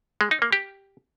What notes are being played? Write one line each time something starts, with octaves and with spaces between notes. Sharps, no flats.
G#3
D#4
A#3
G4